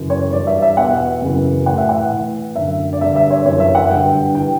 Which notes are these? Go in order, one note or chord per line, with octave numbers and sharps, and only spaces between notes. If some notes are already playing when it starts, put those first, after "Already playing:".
Already playing: F#2 C#3 E3
C#5
G2 E3 D5
E5
E5
E2 B2 F#5
F#2 C#3 E3
A2 E3 F#5
E5
F#5
A2 E3
F#2 D3 E5
D5
G2 D3 E5
E5
C#5
F#2 E3 C#5
E5
F#5
G2 D3 G5
E3 G5